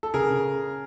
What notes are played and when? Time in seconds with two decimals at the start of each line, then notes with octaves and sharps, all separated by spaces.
0.03 A4
0.14 C#3 G#4 A#4
0.30 C#3